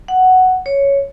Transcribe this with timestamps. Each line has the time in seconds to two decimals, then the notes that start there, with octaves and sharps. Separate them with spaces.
0.08 F#5
0.66 C#5